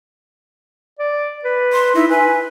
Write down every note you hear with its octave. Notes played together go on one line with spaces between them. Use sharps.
D5
B4
C6
D#4 E4
B4 G#5